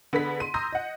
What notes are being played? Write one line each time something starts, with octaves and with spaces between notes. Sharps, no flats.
D3 B3 G#4 B5 B6
C6 D#7
A#5 C6 D#6 E6 G6 A#6
D#5 F#5